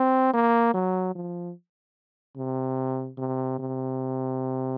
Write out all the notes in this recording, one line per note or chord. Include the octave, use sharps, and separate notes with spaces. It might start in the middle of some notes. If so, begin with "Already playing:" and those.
Already playing: C4
A#3
F#3
F3
C3
C3
C3